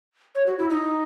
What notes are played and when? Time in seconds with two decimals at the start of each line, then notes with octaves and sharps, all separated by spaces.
0.35 C#5
0.46 F#4
0.58 E4
0.70 D#4